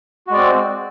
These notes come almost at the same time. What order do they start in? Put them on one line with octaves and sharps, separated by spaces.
F#4 G#3 D5 C4